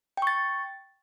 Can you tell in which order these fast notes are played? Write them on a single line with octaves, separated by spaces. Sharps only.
G5 C#6 A6